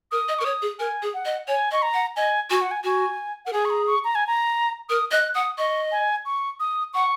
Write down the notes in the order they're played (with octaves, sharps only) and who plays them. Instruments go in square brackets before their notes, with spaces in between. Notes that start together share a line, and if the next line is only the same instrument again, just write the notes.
[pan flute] A#4 [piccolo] D#6
[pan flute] D#5
[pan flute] A#4 [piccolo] C#6
[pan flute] C#5 [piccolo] D#6
[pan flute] G#4
[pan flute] A#4 [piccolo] G#5
[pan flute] G#4
[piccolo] F#5
[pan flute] D#5
[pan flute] C#5 [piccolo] G#5
[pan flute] D#5 [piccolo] C#6
[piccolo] A#5
[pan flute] F#5
[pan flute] D#5 [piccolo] G#5
[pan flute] F#4 [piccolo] G#5
[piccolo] F#5
G#5
[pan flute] F#4 [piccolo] G#5
[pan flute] A#4 [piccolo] F#5
[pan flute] G#4 [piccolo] G#5
[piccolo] C#6
A#5
C#6
A#5
G#5
A#5
[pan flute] A#4 [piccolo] D#6
[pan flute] D#5 [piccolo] F#6
[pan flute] F#5 [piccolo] D#6
[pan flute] D#5 [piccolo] C#6
[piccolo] G#5
C#6
D#6
[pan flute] F#5 [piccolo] C#6